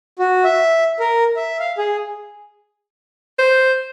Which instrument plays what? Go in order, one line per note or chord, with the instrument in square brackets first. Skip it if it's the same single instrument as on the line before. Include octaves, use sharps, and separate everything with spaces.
[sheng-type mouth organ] F#4
E5
A#4
E5
F5
G#4
[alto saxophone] C5